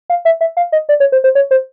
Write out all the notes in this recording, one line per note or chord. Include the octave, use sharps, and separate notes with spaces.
F5
E5
E5
F5
D#5
D5
C#5
C5
C5
C#5
C5